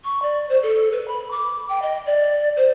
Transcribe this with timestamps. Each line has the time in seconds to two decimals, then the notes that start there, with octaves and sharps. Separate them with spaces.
0.05 C#6
0.22 D5
0.49 C5
0.63 A4
0.92 B4
1.08 B5
1.31 D6
1.69 G5
1.82 D#5
2.06 D5
2.57 C5